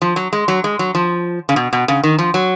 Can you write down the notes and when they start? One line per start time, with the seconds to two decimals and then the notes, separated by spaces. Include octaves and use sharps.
0.02 F3
0.16 F#3
0.33 G#3
0.48 F#3
0.64 G#3
0.79 F#3
0.95 F3
1.49 C#3
1.56 B2
1.73 B2
1.88 C#3
2.03 D#3
2.19 F3
2.34 F#3